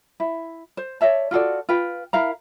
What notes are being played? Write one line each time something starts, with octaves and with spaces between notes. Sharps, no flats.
E4
C5
C#5 D5 E5 A5
F4 F#4 A4 D5
F4 B4 G5
E4 A#4 F5 A#5